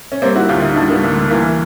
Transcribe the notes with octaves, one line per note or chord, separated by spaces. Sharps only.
C#4
G3 A#3 C4
E4 F#4
D2 F4 G4
D#4 F4
G3 D4 E4
A3 B3
D2 A#3
A3
E3 A#3